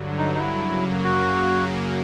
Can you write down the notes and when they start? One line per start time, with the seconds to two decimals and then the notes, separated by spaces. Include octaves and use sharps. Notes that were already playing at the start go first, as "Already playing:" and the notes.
Already playing: G2 D3 F#3
0.18 D#4
0.34 D#4
0.39 E4
0.61 F#2 C#3 F#3 A#3
1.04 F#4